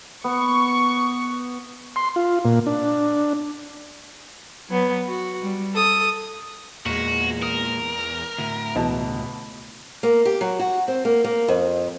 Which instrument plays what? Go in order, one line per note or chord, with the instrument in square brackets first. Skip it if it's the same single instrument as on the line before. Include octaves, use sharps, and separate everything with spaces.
[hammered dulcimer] B3 [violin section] C#6
[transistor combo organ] C6
F4
A#2
D4
[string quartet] F#3 B3
F#4
G3
A4 D#6
[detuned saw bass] E2 [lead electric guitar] A#2 G#3 [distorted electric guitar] F#4
[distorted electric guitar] A#4 [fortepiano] D#6
[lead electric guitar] D2 A2
[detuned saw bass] C#2 [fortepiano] B2 E3 A5
[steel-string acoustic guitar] A#3
G4
F#3
F#4
C4
A#3
A#3
F2